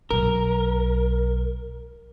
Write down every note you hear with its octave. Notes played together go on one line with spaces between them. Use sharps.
B1 A#4